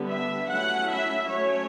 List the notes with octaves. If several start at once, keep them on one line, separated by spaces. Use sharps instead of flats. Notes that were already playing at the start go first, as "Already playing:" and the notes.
Already playing: D3 G3 B3
E5
F#3 A3 C#4 E4 F#5
E5
F#3 A3 C#4 C#5